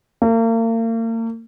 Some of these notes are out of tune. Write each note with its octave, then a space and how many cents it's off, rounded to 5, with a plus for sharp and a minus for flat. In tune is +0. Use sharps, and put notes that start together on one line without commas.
A#3 -40